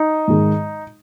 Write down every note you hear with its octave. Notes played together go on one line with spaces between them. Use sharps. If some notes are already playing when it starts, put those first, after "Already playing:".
Already playing: D#4
G#2 D#3 G#3